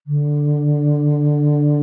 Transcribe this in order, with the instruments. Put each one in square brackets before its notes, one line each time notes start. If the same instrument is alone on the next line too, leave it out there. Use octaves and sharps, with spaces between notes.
[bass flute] D3